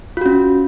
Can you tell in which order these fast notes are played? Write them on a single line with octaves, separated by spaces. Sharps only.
F4 F#4 C#4